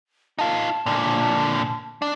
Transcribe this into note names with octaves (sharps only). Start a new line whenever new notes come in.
D#4 F4 A5
A#2 D3
D4